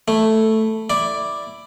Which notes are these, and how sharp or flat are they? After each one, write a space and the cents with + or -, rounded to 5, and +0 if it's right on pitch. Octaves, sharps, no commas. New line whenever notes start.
A3 +0 E4 +0
E4 +0 D5 +0